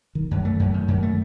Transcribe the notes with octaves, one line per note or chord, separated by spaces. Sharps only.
D#3
F#2
A3
F#2
D#3
F#2
A3